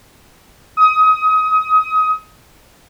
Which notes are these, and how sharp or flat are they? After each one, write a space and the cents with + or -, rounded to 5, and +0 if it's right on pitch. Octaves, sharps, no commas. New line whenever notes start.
D#6 +25